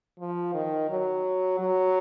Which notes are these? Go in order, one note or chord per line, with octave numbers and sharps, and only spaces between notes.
F3
D#3
F#3
F#3